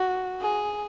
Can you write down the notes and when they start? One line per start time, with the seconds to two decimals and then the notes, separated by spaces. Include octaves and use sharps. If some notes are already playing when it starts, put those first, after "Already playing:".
Already playing: F#4
0.42 G#4